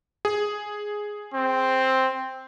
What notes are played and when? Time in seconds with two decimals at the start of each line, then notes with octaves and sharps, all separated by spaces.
0.25 G#4
1.34 C4